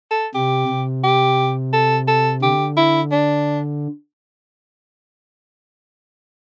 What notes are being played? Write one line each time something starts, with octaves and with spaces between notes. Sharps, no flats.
A4
C3 G4
C3
G4
A4
A4
D3 G4
E4
D4